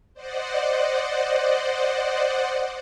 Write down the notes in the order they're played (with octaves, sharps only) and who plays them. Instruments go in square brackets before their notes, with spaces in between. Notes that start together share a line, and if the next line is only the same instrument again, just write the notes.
[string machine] C5 D5 D#5 F#5